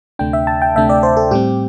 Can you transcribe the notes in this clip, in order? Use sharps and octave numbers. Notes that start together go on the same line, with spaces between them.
D2 C3 A3 D4 G5
E5
A5
G5
D2 C3 A3 D4 E5
D5
C5
A4
A2 G3 C4 G4